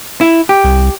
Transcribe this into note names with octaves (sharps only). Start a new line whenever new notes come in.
E4
G4
C2